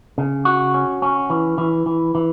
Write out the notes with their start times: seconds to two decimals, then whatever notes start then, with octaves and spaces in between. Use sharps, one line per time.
0.18 C#3
0.45 F#4
0.74 C#4
1.02 C#4
1.30 E3
1.58 E3
1.86 E3
2.15 E3